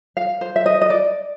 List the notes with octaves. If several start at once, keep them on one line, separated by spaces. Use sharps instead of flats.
F5
C5
E5
D#5
D#5
D5